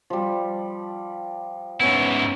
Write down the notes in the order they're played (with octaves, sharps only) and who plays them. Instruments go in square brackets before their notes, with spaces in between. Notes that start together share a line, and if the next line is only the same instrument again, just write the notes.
[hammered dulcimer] F3 G3
[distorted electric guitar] G#2 E4 [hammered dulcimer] B3 C#4